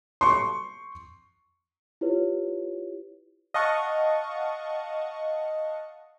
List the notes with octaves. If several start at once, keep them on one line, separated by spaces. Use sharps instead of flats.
C6 C#6
E4 F4 G4 B4 C#5
D#5 F5 F#5 A5 C#6